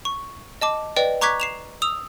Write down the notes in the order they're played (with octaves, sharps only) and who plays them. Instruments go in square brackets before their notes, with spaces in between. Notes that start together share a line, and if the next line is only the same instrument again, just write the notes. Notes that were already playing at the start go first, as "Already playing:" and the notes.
[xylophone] C#6
D#5 A5 D6
B4 D5 D#5 G5
A#5 C#6 D6 F#6 G#6 B6
C7 E7 F7
D#6 E6 F7